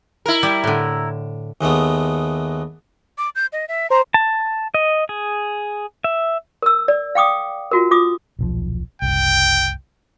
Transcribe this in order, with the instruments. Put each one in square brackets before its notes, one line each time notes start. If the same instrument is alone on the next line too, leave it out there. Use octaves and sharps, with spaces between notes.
[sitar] E4 A#4
[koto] G3
A2 D3
[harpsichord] D#2 G#3 A3 B3
[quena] D6
G6
D#5
E5
[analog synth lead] C5 [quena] A#5
[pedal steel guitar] A5
D#5
G#4
E5
[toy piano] A#4 E6
D5
F5 G5 D6 D#6
F4 F#4 A#4
F4 D6 D#6
[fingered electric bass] D#1 B1 F3
[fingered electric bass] F#1 C2 [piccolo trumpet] G5